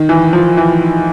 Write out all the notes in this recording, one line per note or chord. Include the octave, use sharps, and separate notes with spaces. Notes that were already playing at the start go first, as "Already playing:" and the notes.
Already playing: D#3
E3
F3
E3